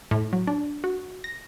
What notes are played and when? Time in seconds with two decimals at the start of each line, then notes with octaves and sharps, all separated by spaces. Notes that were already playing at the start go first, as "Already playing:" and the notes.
0.11 A2
0.33 F#3
0.47 D4
0.84 F#4
1.24 A#6